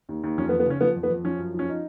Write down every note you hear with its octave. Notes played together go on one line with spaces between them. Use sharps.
D#2
D#2
F2 C#4
B3
F2
B3
C#3 C#4
F3 B3
F2
B3
F2
F3 C#4
F#2
F3 C#4
D#4